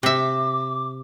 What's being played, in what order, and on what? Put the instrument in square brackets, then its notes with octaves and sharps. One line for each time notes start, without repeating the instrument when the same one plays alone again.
[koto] C3 E5 [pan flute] D6